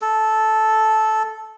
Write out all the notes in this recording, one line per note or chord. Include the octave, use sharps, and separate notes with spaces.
A4